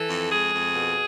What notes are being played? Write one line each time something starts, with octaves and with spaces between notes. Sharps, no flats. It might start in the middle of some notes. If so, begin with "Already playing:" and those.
Already playing: E3 A4
F2
G#3 G#4
F2
B2